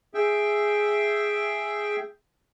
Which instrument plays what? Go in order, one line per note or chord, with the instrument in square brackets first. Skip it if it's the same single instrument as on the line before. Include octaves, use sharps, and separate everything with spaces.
[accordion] G#4 E5 G5